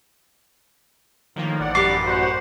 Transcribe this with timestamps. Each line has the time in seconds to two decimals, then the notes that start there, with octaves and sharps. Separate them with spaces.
1.36 A2 D#3 F3 A#3
1.60 A1 D5 F#5
1.75 A1 F#2 G4 B4 D6 C7
2.05 F#4 C5 F#5